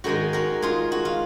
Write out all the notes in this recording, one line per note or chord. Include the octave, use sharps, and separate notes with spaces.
G#2 D#3 G#3 D#4 F#4
F#4 A#4
F4 G#4
F#4
F4